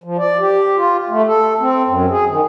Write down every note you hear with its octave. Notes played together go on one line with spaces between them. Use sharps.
F3
D5
G4
F4
A3
A4
C4
F#2
G#4
D#3